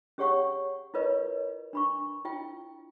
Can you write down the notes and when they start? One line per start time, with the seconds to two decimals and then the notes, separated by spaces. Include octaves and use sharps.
0.18 C#4 G4 G#4 C#5 F#5 C#6
0.94 E4 F4 A#4 B4 C#5 D#5
1.73 D4 B5 C#6
2.25 E4 F4 G5